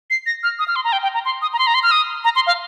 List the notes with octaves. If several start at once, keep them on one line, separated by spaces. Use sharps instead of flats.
C7
A#6
F6
D#6
F6
C6
A#5
G5
G5
A#5
C6
D#6
A#5
C6
A#5
C6
F6
D#6
A#5
C6
F5